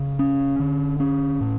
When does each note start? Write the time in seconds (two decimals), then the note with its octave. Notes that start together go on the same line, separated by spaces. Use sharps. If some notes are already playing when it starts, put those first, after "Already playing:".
Already playing: C#3
0.19 C#4
0.60 D3
1.00 C#4
1.41 A2